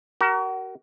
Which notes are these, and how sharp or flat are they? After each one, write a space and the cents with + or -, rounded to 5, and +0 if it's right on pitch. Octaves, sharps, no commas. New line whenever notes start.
F#4 +35 A#4 +0